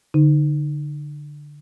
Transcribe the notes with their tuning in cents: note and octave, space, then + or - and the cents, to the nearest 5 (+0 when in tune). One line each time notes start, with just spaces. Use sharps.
D3 +0 D#4 +0